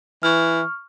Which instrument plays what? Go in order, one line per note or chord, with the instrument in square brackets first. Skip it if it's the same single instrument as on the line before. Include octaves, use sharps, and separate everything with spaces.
[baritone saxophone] E3 [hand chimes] C#6 F6